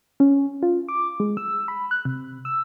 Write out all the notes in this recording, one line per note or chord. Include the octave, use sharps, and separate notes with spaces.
C#4
F4
D6
G#3
E6
B5
F#6
C3
E6